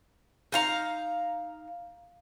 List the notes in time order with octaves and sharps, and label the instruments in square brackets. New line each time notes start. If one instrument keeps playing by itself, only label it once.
[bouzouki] D#4 F5 A#5